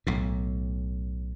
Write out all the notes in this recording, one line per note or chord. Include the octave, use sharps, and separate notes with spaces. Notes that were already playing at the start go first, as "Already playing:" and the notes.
B1 A2